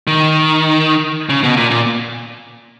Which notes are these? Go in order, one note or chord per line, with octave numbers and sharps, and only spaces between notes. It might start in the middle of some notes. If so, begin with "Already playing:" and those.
D#3
C#3
B2
A#2
A#2